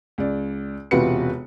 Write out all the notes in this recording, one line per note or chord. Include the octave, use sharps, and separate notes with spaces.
C#2 D5
E1 C3 F4 F#4 B4 C#7